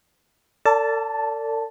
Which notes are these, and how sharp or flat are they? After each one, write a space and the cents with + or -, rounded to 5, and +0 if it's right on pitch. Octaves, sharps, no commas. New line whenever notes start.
A4 +45 D5 -25 A5 +0